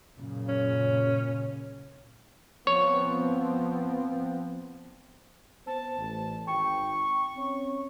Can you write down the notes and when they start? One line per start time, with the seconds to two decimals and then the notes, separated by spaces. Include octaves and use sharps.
0.15 F#2 A#2 C#3
0.48 C#4
2.67 F3 B3 C4 C#5
5.67 B3 C5 A5
5.97 A1
6.47 G#1 G5 C#6
7.36 C4 C#4 C#5